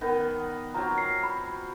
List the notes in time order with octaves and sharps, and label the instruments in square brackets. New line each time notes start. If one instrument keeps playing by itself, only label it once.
[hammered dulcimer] D#3 B3
[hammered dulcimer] F#3 C4 F4 [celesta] A#5
[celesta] C7
B5